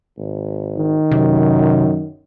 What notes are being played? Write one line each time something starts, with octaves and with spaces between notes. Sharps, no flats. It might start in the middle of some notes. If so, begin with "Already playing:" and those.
G#1
D#3
F#2 C3